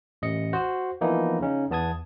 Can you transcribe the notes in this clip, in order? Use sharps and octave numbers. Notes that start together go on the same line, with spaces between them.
A1 D#5 C#7
F#4 C5
E3 F3 A#3 B3 D#4 E4
C#3 C#4 D#4
E2 B3 A5 D#6 G#6